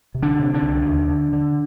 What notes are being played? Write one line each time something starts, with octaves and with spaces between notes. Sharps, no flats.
C3
D3 D4
C3
D3 D4
C2
D#2
D3
D3